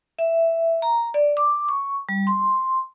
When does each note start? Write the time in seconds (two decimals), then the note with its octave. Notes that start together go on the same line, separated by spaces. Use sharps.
0.19 E5
0.82 A#5
1.14 D5
1.37 D6
1.69 C#6
2.09 G3
2.27 C6